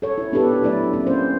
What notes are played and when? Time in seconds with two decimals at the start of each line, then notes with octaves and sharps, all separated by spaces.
0.02 A4 C#5
0.18 E4
0.32 B3 D4 G4 A4 B4
0.62 F#3 A3 D4 E4 D5
0.93 A#3 C4 C#4 E4
1.07 C#4 C5